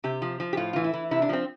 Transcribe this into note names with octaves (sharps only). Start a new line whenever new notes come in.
C3 G4
F3
F3
G4
A2 F4
E3 F4
E4
E3
C3 E4
D4
F3 C4